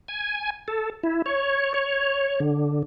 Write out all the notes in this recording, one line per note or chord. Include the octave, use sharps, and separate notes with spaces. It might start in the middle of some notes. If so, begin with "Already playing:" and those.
G#5
A4
E4
C#5
C#5
D3